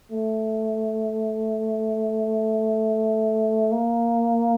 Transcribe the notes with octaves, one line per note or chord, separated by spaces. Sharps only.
A3
A#3